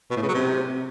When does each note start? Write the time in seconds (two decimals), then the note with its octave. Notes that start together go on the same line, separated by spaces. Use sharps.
0.11 B2
0.16 A2
0.22 C#3
0.28 F#3
0.34 C3